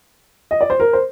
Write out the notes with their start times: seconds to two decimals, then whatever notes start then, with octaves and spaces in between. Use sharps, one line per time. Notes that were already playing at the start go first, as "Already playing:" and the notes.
0.51 D#5
0.61 D5
0.70 C5
0.80 A#4
0.93 C5